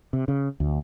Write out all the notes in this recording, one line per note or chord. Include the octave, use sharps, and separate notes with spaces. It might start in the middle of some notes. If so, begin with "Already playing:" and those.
C3
C#3
D2